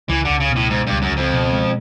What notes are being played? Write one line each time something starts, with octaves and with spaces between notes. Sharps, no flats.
C#2 E3
C#2 D3
C#3
B2
A2
G#2 G#3
C#2 G2
F#2
C#2
F2
B2
G#3